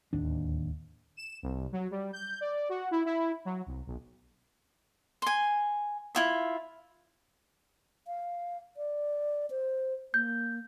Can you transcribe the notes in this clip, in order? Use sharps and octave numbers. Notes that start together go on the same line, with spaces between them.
D1 D#2 D4
E7
C2
F#3
G3
G6
D5
F#4
E4
E4
F#3
C2
B1
G#5 C6
E4 F4 E5
F5
D5
C5
A#3 G6